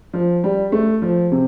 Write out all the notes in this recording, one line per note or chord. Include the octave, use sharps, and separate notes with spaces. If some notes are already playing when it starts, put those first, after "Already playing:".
F3
G3
A3
F3
C3